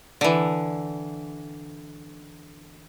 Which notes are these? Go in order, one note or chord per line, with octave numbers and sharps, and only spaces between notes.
D3 E3